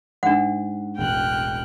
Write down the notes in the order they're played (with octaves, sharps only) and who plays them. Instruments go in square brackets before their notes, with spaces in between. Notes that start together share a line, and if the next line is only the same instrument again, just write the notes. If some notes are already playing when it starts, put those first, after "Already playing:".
[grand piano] G#2 [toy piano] D4 F#5
[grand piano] E1 A1 [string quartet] G5 F6 F#6